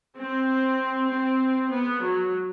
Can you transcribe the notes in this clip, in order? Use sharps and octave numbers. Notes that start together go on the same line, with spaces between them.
C4
C4
B3
F#3